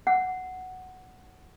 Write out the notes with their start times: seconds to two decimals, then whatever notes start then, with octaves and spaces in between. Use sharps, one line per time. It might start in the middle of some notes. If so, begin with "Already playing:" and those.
0.07 F#5